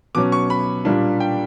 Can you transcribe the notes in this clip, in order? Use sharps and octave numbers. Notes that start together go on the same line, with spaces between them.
B2 F#3 C#4 D6
C#6
B5
A#2 G3 A#3 D4
G5